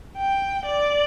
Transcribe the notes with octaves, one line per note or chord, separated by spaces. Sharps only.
G5
D5